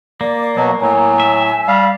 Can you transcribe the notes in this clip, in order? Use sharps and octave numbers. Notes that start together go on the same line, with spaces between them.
A#3 D5
B2 F#3
A2 F#3 G#5
E5
G3 F5